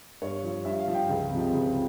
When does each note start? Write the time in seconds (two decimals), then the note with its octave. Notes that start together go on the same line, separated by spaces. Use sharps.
0.22 G2 C#5
0.43 F3
0.65 G2 E5
0.80 F5
0.88 F3
0.94 G5
1.09 C#2
1.31 C3 F3
1.53 C#2